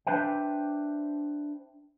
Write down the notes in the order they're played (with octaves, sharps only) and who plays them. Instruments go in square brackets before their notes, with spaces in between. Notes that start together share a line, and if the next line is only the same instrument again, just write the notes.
[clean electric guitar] D4 B4 C5 E5 G5